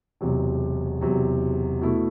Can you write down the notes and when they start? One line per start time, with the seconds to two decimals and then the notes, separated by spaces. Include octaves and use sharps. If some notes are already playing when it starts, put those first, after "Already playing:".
0.21 E1 E2 C3 F#3
1.01 E1 E2 C3 F#3
1.81 B2 A3 E4